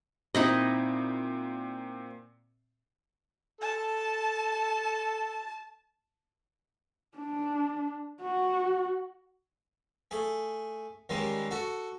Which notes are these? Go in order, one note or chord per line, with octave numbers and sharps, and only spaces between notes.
A#2 C4 D#4 E4 D#5
A4 A5
D4
F#4
A3 G#4
D#2 D#3 G3 G#3 C#4 C6
F#4 A4 C#6